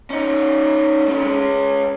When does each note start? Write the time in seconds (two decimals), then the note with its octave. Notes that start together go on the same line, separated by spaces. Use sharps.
0.10 C#4 D#4
1.08 A3 C#4
1.23 G#3 C#4